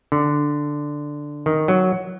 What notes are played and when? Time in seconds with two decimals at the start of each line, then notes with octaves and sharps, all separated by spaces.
0.12 D3
1.46 D#3
1.68 F#3